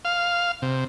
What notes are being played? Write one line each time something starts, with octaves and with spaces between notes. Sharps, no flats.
F5
C3